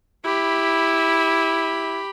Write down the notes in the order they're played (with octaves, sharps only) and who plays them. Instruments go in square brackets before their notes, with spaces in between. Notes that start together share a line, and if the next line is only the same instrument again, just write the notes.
[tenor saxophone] E4 [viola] G4 B5